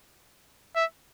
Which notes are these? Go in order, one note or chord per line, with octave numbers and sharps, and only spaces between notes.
E5